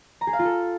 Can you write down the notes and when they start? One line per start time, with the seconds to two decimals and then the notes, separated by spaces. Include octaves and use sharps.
0.21 A#5
0.27 G#4
0.33 F5
0.39 F4
0.45 A4